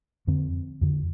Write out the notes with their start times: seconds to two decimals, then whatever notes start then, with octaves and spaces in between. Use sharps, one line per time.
0.27 F2 D3 C4
0.81 F2 D3